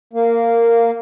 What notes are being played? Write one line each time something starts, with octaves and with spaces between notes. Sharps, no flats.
A#3